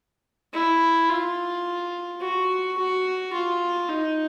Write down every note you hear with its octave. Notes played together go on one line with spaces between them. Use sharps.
E4
F4
F#4
F#4
F4
D#4